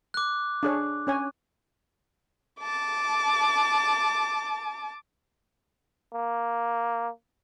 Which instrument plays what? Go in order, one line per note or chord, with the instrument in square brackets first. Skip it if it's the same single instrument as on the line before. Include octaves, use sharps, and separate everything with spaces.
[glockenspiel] D6 F#6
[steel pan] D4 G#4 C#5
C#4 C#5 G#5
[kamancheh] A5 D6
[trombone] A#3